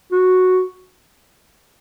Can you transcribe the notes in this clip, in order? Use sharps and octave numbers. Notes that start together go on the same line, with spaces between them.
F#4